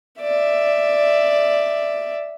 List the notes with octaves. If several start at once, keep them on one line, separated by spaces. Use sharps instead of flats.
D5 E5